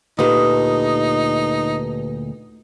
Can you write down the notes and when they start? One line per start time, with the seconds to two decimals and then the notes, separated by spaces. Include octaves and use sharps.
0.19 D2 A#2 D#4 G4 B4 D#6